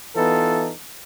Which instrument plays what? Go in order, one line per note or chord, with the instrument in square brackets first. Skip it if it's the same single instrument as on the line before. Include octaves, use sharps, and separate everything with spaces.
[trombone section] E3 B3 D#4 F4 A4